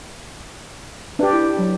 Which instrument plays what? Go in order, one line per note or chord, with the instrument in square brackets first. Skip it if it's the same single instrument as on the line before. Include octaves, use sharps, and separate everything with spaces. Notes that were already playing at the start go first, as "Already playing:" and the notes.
[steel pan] D4 G4 [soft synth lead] B4
[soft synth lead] E4
F#3